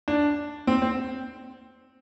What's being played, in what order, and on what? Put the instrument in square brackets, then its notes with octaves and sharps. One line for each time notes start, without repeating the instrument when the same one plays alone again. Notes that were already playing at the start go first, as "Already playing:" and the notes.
[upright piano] D4
C4
C4